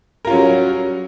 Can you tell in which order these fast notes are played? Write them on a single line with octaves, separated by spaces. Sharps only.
A#4 F4 C#4 F#3 G3